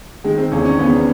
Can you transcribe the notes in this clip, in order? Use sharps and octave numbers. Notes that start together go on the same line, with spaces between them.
D#3 G#3
C4
E2 C#4
C#4
E2 B3